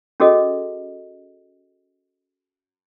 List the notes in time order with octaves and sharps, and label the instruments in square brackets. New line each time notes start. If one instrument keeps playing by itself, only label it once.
[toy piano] C#4 F#4 G#4 A4 D#5